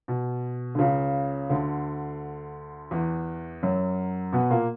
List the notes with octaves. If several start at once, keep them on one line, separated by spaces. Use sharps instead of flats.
B2
D3
C#2 C#3
D2 D3
E2 E3
F#2 F#3
B2 B3
A#2 A#3